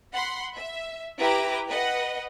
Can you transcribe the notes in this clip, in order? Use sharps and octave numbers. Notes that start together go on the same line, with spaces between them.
F#5 B5 C6
E5
E4 G4 B4 E5 A#5 D6
B4 D#5 F#5